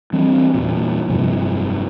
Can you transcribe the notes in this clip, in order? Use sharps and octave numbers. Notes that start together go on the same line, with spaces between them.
E3 G3 C4
E2 A#2
F1 G2 C3 F3